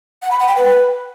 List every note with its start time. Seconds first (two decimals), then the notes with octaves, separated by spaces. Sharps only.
0.22 F#5
0.31 B5
0.39 F#5
0.48 G5
0.56 B4